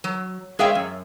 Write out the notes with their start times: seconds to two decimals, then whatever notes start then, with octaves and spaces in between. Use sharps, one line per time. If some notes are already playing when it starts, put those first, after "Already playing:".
0.04 F#3
0.59 G#3 G#4 C#5 E5 F5 G5
0.75 F#2